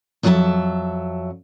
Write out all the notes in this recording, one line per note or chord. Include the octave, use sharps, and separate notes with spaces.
F2 F#3 D4 G#4 E5 A5